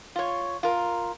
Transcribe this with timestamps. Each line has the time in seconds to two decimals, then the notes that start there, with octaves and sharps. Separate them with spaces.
0.16 F4 C#5
0.63 F4 A#4